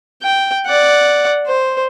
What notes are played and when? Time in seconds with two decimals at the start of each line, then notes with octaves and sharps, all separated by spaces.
0.22 G5
0.66 D5 F#5
1.47 C5